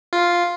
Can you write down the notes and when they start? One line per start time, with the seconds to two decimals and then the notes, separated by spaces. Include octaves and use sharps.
0.13 F4